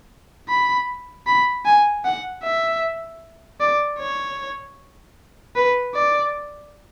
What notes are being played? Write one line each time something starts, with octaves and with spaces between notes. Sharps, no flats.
B5
B5
G#5
F#5
E5
D5
C#5
B4
D5